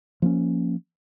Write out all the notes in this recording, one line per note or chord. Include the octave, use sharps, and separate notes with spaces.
F3 A#3 C#4